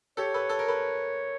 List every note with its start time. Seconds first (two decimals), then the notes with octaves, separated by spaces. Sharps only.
0.17 G4 A4 C#5
0.34 A4 B4
0.49 A4
0.59 A#4
0.68 A4 B4